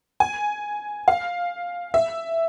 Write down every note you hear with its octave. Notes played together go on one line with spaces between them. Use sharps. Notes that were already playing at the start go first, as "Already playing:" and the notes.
G#5
F5
E5